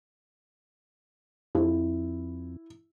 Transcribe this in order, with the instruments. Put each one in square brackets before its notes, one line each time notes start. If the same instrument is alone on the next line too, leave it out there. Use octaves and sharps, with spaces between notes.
[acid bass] F2 [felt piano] E4